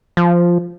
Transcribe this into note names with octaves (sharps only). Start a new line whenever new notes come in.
F3